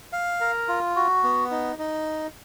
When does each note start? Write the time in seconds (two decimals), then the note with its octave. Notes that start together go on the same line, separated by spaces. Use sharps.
0.13 F5
0.41 A#4
0.68 F4
0.96 F#4
1.23 B3
1.51 D#4
1.79 D#4